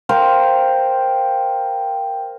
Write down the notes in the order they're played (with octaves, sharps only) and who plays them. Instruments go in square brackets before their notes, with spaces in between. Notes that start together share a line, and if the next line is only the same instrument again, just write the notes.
[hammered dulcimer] A#4 C5 F5 G5